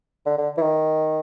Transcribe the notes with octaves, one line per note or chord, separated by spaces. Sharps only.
D3
D3
E3
D#3